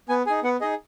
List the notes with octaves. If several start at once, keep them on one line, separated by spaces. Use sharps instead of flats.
B3 G#5
D#4 G#4 G#5
B3 F#5
D#4 G#4 D#5